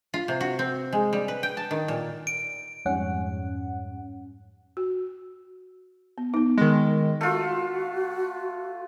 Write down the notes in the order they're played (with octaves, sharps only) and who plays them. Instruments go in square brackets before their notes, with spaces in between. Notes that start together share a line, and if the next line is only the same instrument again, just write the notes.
[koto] F4
C3
F#4
C4
G#3
G3
B4
G5
A5
D#3
A#2
[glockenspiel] D7
[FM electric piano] F2 G#2 G3 C#4 F#5
[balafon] F#4
B3
B3 D#4
[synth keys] D#3 G#3
[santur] A3 F4 [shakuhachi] F#4